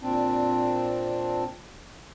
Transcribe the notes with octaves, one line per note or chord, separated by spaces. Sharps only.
A#2 C4 D4